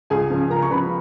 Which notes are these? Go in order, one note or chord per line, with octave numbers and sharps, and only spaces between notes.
C#2 G#4 G#5
C#3 F3
C#2 A#4 A#5
C#6
C#3 F3 B4 B5